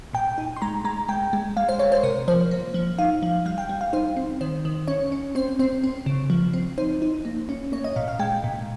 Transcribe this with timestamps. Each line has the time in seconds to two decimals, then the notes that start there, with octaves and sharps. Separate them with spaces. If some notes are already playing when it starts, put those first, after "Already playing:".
0.13 A#2 G5
0.38 D#4
0.56 C6
0.62 G#3 A#5
0.85 G#3 A#5
1.08 G#3 G5
1.33 G#3
1.57 G#3 F5
1.69 C5
1.79 G#3 C#5
1.92 C5
2.03 C3 A#4
2.28 F3 C5
2.51 A#3
2.74 F3
2.99 D#4 F5
3.23 F3
3.46 G3 F5
3.58 G5
3.69 G3
3.81 F5
3.93 D#4 C5
4.17 C4
4.41 D#3 C5
4.65 D#3
4.88 C#4 C#5
5.12 C#4
5.35 C4 C5
5.59 C4 C5
5.84 C4
6.06 C#3
6.30 F3
6.53 C4
6.78 D#4 C5
7.02 D#4
7.25 A#3
7.49 C#4
7.72 A#3 C#5
7.84 D#5
7.96 A#2 F5
8.08 F5
8.19 G#3 G5
8.44 A#2